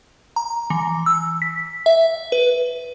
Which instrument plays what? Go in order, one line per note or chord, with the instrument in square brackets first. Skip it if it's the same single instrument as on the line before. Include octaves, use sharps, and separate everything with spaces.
[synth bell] A#5
E3
E6
B6
E5
B4